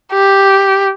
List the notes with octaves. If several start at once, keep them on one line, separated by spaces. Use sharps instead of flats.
G4